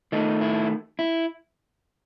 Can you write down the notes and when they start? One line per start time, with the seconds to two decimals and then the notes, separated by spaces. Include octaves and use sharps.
0.12 D#3 A3 D#4
0.41 E4
0.99 E4